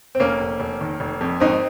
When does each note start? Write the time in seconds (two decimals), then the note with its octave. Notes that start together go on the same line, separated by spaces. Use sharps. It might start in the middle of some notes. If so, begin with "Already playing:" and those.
0.15 C4
0.20 F1 A#3 C#4
0.40 F1
0.60 F1
0.81 D#3
1.00 F1
1.21 F2
1.40 G#1 C4 D#4